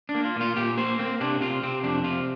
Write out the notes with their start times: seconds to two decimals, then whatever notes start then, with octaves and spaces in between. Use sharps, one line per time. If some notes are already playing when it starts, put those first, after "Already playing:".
0.09 D4
0.15 A#3
0.25 F4
0.36 A#2 F4
0.57 A#2 G4
0.77 A#3 C5
0.99 A#3 C4
1.20 C3 D4
1.41 C3 F4
1.63 C3 C4
1.84 F2 D4
2.04 C3 F4